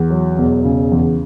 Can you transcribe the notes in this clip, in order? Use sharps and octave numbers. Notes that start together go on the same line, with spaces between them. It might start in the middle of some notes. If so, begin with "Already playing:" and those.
Already playing: E2
F#3
E1
C#3
E2